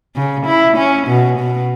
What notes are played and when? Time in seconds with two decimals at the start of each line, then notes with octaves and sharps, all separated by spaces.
0.16 C#3
0.46 E4
0.77 C#4
1.08 B2
1.39 B2